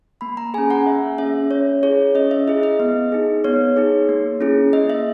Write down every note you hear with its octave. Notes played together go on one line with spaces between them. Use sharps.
A#3 B5
A#5
C#4 G#4 G#5
F#5
A#3 E5
C#4 G#4 E5
C#4 C#5
E4 G#4 C#5
C#4 D#5
E5
E4 G#4 D#5
D#5
B3
D#4 G#4
B3 C#5
D#4 G#4
A#3
C#4 E4 G#4
A#3 D#5
E5